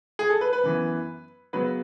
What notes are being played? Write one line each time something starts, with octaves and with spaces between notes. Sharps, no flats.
G#4
A4
B4
B4
F#2 E3 B3
F#2 C#3 F#3 B3 B4